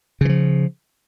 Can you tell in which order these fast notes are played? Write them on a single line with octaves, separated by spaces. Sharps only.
C#3 E3 F3